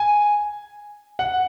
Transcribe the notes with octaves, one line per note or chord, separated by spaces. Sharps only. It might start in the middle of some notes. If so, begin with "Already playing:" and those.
Already playing: G#5
F#5